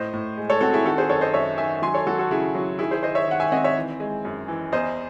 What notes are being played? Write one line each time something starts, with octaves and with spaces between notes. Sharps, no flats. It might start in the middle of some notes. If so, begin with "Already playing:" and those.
Already playing: A2 C5 D#5
A2
G#3
A4 C#5
C4 F#4 A4
E4 G#4
D#3 F#4 A4
G#4 C5
F#2 A4 C#5
C5 D#5
F#2 C#5 E5
D#3 E5 G#5
F#3 G#5 C6
A4 C#5
F#3 F#4 A4
F#4 A4
C#3 E4 G#4
F#3
D#3 E4 G#4
G#4 C5
D#3 C5 D#5
C#5 E5
D#3 F#5
E5 G#5
C4 D#5 F#5
C#5 E5
E3
G#3
F#2
E3
E2 C5 D#5